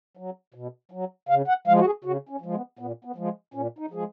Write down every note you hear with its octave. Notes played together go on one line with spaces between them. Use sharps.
F#3
B2
F#3
C#3 F5
F#5
F3 G#3 F5
F#4
G#4
C#3 F#4
C#4
F3 G#3
B3
A#2 B3
B3
F3 G#3
A#2 C#4
D#4
F3 G#3 G#4